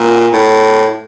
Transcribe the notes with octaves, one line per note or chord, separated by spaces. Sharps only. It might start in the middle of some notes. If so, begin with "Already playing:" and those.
Already playing: A#2
A2